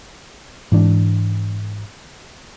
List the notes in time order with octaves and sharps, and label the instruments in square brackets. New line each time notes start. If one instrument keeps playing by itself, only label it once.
[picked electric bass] G#2 E3 D4